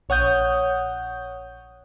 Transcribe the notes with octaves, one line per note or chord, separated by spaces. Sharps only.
A#1 C#5 F#5 D#6 G6